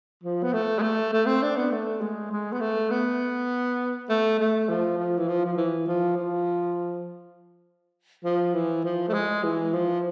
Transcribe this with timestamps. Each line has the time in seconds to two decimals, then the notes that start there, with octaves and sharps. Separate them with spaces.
0.24 F3
0.43 B3
0.53 A3
0.79 G#3
0.82 A3
1.13 A3
1.27 C4
1.43 D4
1.57 B3
1.72 A3
2.01 G#3
2.32 G#3
2.53 B3
2.60 A3
2.90 B3
4.09 A3
4.39 A3
4.69 F3
4.98 F3
5.18 E3
5.28 F3
5.46 F3
5.57 E3
5.87 F3
6.17 F3
8.24 F3
8.54 E3
8.85 F3
9.08 A3
9.14 G#3
9.43 E3
9.73 F3